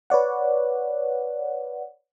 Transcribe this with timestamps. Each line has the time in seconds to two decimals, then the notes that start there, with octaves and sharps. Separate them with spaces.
0.10 B4 C#5 D5 F#5